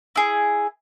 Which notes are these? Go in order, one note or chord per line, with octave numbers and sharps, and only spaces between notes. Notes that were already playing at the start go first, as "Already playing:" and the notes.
E4 G#4